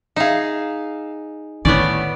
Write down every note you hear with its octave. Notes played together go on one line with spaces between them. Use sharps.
D#4 G#4 E5 F5
A2 D3 D#3 B3 C#4 D5